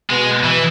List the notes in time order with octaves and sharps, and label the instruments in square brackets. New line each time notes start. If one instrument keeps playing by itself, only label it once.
[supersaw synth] B2 B3 [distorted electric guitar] G#3
[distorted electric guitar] E3